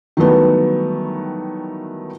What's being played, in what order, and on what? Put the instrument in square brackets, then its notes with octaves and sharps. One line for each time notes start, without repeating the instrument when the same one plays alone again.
[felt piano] D#3 E3 F#3 G3 A3 B3